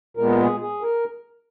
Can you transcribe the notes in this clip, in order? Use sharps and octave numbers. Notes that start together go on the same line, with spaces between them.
A#2 G#3 B3 A#4
G#4
G#4
A#4